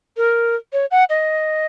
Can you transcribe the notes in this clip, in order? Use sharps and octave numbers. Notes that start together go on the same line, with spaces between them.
A#4
C#5
F#5
D#5